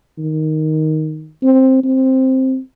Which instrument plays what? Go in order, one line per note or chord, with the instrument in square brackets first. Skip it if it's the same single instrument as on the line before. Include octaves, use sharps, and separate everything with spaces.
[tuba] D#3
C4
C4